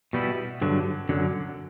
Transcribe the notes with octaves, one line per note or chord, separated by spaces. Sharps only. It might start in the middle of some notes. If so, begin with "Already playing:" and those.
B2 G3 B3 E4
G2 D3 F#3
F#2 D3 F#3